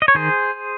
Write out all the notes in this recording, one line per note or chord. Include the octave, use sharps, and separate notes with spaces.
D#5
C#5
D#3 G#4 C5